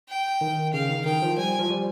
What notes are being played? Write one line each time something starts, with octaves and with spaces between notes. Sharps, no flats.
G5
D#3
C#3 F5
D#3
D#3 G5
F3
G3 G#5
F3
G3